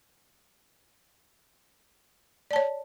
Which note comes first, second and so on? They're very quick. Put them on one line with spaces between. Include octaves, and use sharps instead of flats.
D5 A5 C#5